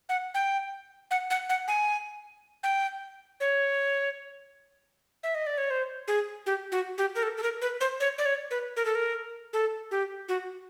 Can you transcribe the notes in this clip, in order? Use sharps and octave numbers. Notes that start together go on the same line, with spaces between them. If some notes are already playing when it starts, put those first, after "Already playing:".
F#5
G5
F#5
F#5
F#5
G#5
G5
C#5
E5
D#5
D5
C#5
C5
G#4
G4
F#4
G4
A#4
A4
A4
A#4
B4
C5
C#5
D5
C#5
B4
A#4
A4
A#4
A4
G4
F#4